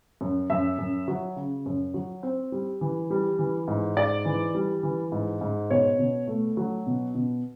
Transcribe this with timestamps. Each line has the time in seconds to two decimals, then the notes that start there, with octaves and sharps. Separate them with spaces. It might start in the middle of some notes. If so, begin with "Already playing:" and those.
0.21 F#2
0.50 F#2 E5
0.78 F#2
1.08 F#3
1.36 C#3
1.66 F#2
1.94 F#3
2.23 C4
2.52 G3
2.81 E3
3.10 G3
3.39 E3
3.68 G#2
3.97 G#2 D5
4.25 E3
4.55 G3
4.83 E3
5.12 G#2
5.41 G#2
5.70 B2 C#5
5.99 B2
6.28 A3
6.57 F#3
6.86 B2
7.15 B2